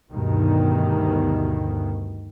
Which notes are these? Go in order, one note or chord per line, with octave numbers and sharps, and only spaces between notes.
D2 G2 B2 D#3